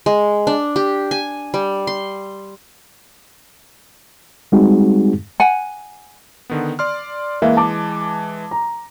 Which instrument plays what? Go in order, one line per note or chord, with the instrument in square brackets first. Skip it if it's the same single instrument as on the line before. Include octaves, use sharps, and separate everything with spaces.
[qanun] G#3
D4
G4
G#5
G3
C6
[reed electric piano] G3 G#3 C4 D#4 F#4 G#4
[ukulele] F#5 G#5
[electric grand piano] D3 D#3 B3
D5 C6 F6
[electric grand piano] E3 G#3 [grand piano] A#3 E5 F5
[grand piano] A5 D6
A#5